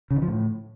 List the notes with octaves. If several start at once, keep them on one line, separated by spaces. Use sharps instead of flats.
C#3
D#3
F3
A2